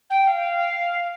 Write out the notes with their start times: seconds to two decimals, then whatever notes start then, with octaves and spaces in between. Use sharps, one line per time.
0.10 G5
0.27 F5